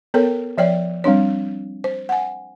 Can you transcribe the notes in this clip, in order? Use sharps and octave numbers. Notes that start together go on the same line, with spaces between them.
B3 A4 A#4 C#5 G5
F3 C#5 D5 G5
G3 C4 D4 C#5
C5
F#5 G#5